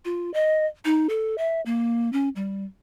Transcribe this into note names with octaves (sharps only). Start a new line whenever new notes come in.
F4
D#5
D#4
A4
E5
A#3
C#4
G3